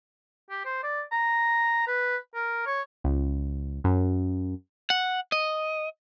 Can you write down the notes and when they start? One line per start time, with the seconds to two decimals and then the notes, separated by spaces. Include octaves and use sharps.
0.50 G4
0.65 C5
0.83 D5
1.12 A#5
1.87 B4
2.35 A#4
2.66 C#5
3.04 C#2
3.84 F#2
4.90 F#5
5.32 D#5